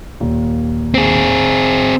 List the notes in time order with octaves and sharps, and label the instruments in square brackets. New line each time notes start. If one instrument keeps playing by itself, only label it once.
[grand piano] D#2 A#2
[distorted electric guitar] C4 G#4